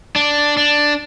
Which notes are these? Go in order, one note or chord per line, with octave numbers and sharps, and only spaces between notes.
D4
D4